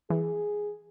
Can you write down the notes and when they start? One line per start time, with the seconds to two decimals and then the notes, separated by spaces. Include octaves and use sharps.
0.10 E3 G#4